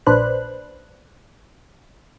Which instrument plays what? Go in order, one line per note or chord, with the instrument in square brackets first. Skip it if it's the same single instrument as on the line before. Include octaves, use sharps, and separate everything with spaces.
[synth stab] A#1 A#2 D4 B4 C5 F#6